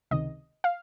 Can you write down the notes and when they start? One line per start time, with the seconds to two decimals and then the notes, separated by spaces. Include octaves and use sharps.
0.11 C#2 C3 D#3 D#5
0.64 F5